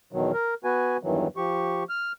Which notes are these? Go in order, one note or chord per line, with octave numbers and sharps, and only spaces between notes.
E2 B2 D#3 F#3
A#4
B3 F#4 B4 G#5
E2 G2 D#3 E3 F#3
F3 G4 C#6
F6